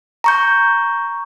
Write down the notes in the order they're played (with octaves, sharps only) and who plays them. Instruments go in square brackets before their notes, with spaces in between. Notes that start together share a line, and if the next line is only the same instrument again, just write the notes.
[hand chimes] A#5 C#6 G6